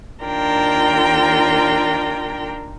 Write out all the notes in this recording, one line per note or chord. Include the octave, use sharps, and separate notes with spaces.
D#2 D4 F4 A#4 G5